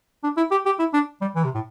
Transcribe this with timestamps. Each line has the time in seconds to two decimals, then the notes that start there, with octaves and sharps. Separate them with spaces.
0.24 D4
0.37 E4
0.51 G4
0.66 G4
0.79 E4
0.94 D4
1.22 G3
1.36 E3
1.44 C3
1.55 A2